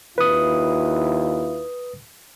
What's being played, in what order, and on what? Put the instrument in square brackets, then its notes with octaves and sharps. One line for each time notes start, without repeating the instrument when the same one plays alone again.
[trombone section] D#2 E4 F4 [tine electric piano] B4 D#6